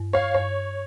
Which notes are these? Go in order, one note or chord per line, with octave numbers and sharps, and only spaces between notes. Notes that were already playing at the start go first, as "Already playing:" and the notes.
Already playing: G2
C#5 F5
G2 C#5